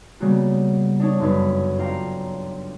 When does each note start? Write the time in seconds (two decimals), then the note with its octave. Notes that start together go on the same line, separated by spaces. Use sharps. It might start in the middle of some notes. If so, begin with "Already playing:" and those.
0.20 C#3 G3 A#3 B3 F#4
1.00 D4 D#4 C#5 A5
1.20 G1 F#2 D#4 B4
1.78 D4 F4 F5 G5 A#5